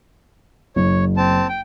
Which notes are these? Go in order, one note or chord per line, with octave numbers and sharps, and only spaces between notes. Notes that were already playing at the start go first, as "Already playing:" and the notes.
F#1 C#5
C4 A5
G5